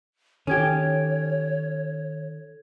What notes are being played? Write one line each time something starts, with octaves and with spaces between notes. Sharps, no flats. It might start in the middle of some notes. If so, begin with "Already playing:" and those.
D#3 C#4 G4 A4 C#5 G#6